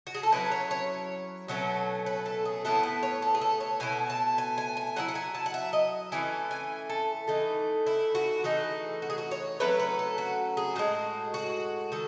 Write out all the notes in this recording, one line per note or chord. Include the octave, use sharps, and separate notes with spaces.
F#4
G#4
A4
F#3 C#4 E4 B4
C#5
C#5
B2 F#3 A3 C#4
B4
A4
G#4
A2 F#3 B3 E4 A4
B4
C#5
A4
G#4
A4
C#5
B2 A3 E4 G#5
A5
G#5
G#5
G#5
F#3 C#4 E4 F#5
F#5
G#5
A5
F#5
E5
D#5
E3 A3 C#4 E4 G#5
G#5
A4
E3 A3 D#4
E4
F#4
E3 A3 D#4 G#4
F#4
G#4
F#4
C#5
F#3 A3 C#4 E4 B4
B4
A4
F#4
G#4
A2 E3 G#3 F#4
F#4
D#3 A4